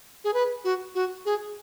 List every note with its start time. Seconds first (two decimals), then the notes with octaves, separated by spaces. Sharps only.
0.24 G#4
0.34 B4
0.64 F#4
0.95 F#4
1.25 G#4